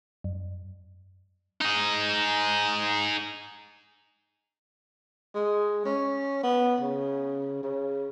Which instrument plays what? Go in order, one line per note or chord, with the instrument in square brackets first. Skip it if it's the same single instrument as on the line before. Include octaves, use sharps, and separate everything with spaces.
[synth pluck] F#2
[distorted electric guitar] D#4 G#4
[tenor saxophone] G#3
C#4
B3
C#3
C#3